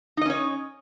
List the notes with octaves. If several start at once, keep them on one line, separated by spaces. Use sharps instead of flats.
C#4 D#4 C#5 D#5